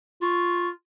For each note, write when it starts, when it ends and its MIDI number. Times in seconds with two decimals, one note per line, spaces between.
0.22 0.71 65
0.22 0.69 85